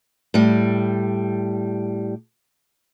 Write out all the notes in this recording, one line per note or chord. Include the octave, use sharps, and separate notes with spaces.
A2 G3